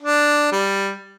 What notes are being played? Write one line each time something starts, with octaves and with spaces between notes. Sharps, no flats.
D4
G3